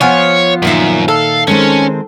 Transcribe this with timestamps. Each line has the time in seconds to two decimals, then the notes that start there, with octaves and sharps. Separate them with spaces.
0.01 F3 B3 C#5 G#5
0.62 F#2 A#2 D#3 E5
1.08 A4 F5
1.47 D#3 G#3 C4 C#4